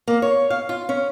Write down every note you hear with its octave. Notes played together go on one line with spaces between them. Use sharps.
A#3
C#5
F5
F4
C#4